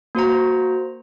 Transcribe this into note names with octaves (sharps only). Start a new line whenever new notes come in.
A#3 F#4 C5 A#5